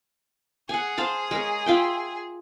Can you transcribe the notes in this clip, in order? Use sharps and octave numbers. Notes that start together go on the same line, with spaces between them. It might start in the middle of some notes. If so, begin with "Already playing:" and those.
G#4 F#5 G#5
C5 F5 A5
G#3 A#4 C#5
F4 E5 G5